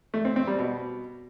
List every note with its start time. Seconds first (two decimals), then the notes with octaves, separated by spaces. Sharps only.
0.14 A3
0.25 C4
0.36 C4
0.47 G3
0.59 B2